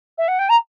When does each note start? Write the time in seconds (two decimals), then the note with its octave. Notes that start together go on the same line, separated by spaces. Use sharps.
0.18 E5
0.28 F#5
0.39 G5
0.49 A#5